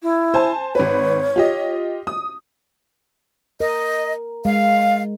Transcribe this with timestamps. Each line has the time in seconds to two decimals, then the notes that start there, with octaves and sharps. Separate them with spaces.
0.03 E4
0.34 C5 G#5 A5
0.75 G#1 B4 C#5
1.36 F4 G4 D#5
2.07 D#6
3.60 A#4 D#5
4.45 G#3 F5